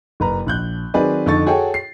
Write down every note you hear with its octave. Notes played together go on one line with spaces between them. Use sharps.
F#1 B4 A#5
A#1 F#6 G6
D#3 F#3 C4 G#4 B4 D5
F2 D3 D#4 C#6 A6
F#4 G#4 A4 C#5 G5
C7